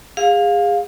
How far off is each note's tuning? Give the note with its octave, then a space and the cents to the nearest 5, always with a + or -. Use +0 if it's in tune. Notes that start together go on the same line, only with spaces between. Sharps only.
G#4 -30 F5 +15